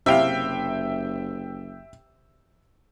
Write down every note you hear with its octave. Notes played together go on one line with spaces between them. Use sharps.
F#1 C3 E4 E5 F5 G5